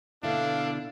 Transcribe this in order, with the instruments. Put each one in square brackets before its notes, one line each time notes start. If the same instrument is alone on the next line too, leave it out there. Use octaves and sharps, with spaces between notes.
[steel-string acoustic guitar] B2 D3 E4 [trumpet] D4 [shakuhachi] A4 [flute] F5